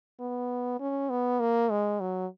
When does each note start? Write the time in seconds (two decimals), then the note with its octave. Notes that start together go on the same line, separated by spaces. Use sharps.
0.20 B3
0.80 C#4
1.10 B3
1.40 A#3
1.71 G#3
2.00 F#3